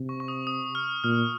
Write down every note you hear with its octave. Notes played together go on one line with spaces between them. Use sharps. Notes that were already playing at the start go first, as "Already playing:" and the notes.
Already playing: C3
C#6
C#6
D#6
D#6
F6
A#2 F6